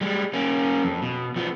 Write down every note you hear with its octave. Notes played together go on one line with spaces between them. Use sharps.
G3 G#3
A#3 C#4
F2
B2
F3 B3